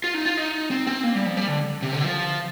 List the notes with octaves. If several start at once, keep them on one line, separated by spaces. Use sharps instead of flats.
F4
D#4
F4
D#4
C4
C4
A#3
G3
F3
G3
D3
C3
D3
F3